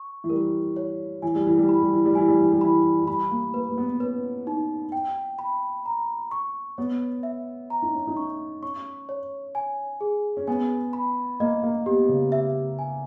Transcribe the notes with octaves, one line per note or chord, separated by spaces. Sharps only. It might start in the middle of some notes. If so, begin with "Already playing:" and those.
Already playing: C#6
E3
G3 A#4
C#5
E3 G#5
G3
E3
G3
E3 B5
G3
E3
G3
E3 G#5
G3
E3
G3
E3 B5
E3
G3 B5
A#3
A#3 B4
A#3
B3
C#4 B4
D#4
G5
B5
A#5
C#6
B3 C#5
E5
A#5
D#4
C#4
D#4
C#6
C#4 C#6
C#5
G#5
G#4
C#4
B3 G#5
B5
A#3 D#5
A#3
B3 G4
C#3
E5
G#5